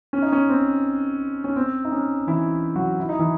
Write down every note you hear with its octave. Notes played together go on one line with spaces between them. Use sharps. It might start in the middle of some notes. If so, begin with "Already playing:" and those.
C#4
D#4
C#4
C4
C#4
C4
D#4
C#4
E3 E4
F#3 F#4
E4
D#4
E3 E4